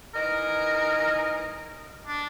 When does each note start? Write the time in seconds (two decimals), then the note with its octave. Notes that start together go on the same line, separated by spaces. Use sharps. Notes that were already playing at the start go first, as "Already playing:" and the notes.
0.14 E3 D#4 A#4 D#5
2.07 D4